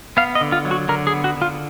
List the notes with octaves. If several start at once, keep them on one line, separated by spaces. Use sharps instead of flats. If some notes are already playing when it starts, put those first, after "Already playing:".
B3 F5
D#5
D3
F4
F#3
F#4
D3 A#4
G#4
B3
F#4
D3 F4